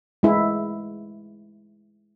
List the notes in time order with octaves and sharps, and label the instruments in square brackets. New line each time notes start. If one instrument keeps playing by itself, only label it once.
[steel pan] G#3 E4